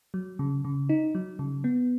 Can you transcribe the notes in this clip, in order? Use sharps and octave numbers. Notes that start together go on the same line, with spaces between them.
F#3
C#3
C#3
D#4
F#3
C#3
B3